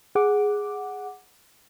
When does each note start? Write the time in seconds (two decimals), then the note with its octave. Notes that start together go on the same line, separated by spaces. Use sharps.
0.15 G#4 F#5 D6